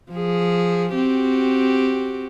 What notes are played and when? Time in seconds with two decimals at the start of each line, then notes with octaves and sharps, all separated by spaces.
0.12 F3 G#4
0.94 C4 F#4 G4